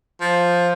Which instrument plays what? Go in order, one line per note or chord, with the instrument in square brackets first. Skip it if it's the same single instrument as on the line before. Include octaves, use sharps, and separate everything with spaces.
[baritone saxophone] F3